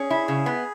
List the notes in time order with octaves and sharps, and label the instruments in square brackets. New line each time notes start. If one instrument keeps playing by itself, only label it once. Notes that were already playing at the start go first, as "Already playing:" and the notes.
Already playing: [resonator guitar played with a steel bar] C#4 [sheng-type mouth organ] G#4
[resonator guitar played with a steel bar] E4
C#3
B3